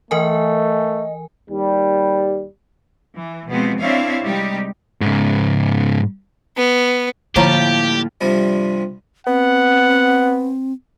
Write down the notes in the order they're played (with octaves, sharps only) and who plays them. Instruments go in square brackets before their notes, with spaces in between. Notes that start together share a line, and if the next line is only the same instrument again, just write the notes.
[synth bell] E3 A#4 G#5 [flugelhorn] A3 [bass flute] D#5
[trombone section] D#2 G3
[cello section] E3
B2 F3 G#3 B3 C4
C4 D4 E4 C#5 E5 F5
C3 G3 G#3 D#4 G4
[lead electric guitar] G#2 C#3
[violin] B3
[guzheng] A2 F3 G3 [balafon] D3 C#5 A#5 [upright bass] A#3 [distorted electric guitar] G4
[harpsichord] G2 C3 F3 G3
[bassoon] B3 [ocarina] C4 [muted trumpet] F#5